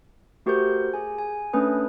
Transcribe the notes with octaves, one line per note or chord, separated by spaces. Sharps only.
A3 F#4 G4 A#4 C5 G6
G#4 G#5
G#5
A3 C#4 D4 B4 D#6